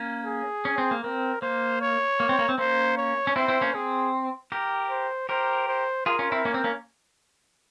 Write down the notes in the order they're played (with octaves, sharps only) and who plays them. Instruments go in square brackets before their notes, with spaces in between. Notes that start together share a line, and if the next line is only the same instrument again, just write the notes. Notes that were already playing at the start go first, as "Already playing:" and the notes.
Already playing: [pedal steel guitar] A#3 C#4
[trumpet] G#4
[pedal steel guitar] C#4
C4
A#3
[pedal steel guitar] C4 [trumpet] A#4
[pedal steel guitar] A#3 [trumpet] C5
[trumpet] C#5
[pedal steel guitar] A#3
C4
A#3
C4
[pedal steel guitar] A#3 C#4 [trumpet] C5
[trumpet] C#5
[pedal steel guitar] C#4
[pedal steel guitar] C4 E4 [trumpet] C5
[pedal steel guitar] C4 E4
A#3 C#4
[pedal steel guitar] C4 [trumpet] G#4
[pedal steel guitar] G4 A#4
[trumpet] C5
[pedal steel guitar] G4 A#4 [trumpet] C5
[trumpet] C5
[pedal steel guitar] F4 G#4 [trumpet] A#4
[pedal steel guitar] C#4 F4
C4 E4
A#3 C#4
C4
A#3 C#4